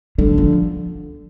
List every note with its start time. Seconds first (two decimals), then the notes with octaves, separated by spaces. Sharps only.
0.18 D3 G3
0.38 F3